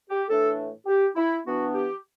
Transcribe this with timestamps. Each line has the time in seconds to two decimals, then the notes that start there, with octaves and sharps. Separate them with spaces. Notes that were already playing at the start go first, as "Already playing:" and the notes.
0.09 G4
0.28 A2 E3 A3 D4 A4
0.86 G4
1.16 E4
1.45 E3 B3 D4 F#4
1.74 G4